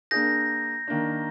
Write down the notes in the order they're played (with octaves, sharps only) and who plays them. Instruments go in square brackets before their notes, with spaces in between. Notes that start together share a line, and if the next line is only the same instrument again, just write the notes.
[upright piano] A#3 D4 G#4 [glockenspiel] G6 A#6
[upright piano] D#3 A#3 D4